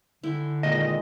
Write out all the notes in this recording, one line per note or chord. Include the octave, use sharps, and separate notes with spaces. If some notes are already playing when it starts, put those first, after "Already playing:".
D3 E4 G5 G#5
A#2 D#3 G#3 A#3 D#5